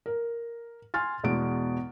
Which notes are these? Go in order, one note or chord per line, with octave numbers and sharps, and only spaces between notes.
A#4
G#5 C6 F6 A6
E2 B2 G#3 D7